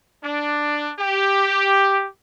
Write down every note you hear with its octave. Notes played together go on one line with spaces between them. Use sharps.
D4
G4